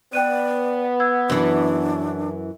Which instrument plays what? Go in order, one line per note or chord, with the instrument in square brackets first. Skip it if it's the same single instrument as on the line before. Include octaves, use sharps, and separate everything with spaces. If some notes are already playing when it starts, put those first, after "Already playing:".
[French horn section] B3 [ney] D5 [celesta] G5 F#6 D#7
[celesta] F#5 E6 G#6
[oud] F#2 E3 [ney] D4